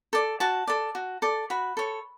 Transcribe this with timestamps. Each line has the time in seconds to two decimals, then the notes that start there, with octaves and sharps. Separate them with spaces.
0.13 A4 D5
0.40 F#4 A5
0.67 A4 D5
0.95 F#4
1.22 A4 D5
1.50 F#4 B5
1.77 A4 C#5